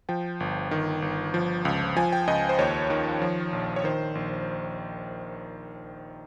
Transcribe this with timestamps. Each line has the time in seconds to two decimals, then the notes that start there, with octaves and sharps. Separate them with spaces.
0.09 F3 G5
0.40 G1
0.71 D#3
1.02 G1
1.34 F3
1.65 C#2
1.96 F3 G#5
2.13 G5
2.27 C#2 D#5
2.49 C5
2.58 D#2 C#5
2.90 D#3
3.22 F3
3.53 A#1
3.76 C#5
3.84 D#3 C5
4.15 A#1